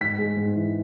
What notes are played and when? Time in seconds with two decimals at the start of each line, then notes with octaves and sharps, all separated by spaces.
0.01 G#2 B6
0.18 G#3
0.37 G#2
0.56 E3